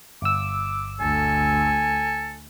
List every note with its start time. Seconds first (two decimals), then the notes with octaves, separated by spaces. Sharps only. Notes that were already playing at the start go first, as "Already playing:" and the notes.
0.22 G1 D6 E6
1.00 D2 A4 G#5